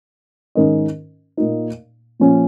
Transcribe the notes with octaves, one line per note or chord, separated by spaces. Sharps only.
G#2 D#3 C#4 A#4 D#5
A#2 A#3 D#4
A#2 F3 C#4